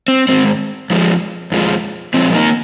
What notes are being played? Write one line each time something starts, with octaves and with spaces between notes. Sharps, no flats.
C4
G#2 D#3 G#3 C4
F2 F3 G#3
F2 F3 G#3
A#2 F3 G#3 C4
A#3 D#4